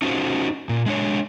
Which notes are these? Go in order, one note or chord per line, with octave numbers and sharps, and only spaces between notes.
C#4 D#4 F4 F#4 C5
A#2
G#3 D4 C#5